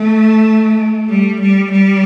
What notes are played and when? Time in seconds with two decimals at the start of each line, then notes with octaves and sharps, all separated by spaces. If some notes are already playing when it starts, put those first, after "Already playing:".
Already playing: A3
1.10 G3
1.41 G3
1.71 G3